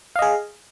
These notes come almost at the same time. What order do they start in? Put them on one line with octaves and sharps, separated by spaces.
F5 D#5 G#4